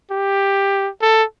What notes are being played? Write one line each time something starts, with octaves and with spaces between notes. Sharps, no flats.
G4
A4